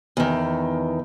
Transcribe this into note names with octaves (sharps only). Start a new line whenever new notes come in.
E2 D#3